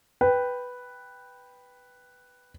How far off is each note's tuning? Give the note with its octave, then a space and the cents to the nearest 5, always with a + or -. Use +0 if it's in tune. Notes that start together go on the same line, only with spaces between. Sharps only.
B4 +0 G5 +0